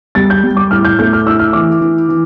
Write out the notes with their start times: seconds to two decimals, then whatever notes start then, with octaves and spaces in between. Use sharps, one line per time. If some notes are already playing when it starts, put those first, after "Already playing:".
0.15 G3 A6
0.30 G6
0.44 G3
0.57 D6
0.71 A2 F6
0.85 G6
0.99 A3 G6
1.13 F6
1.26 E4 E6
1.39 F6
1.53 E3 D6
1.81 E3
2.09 E3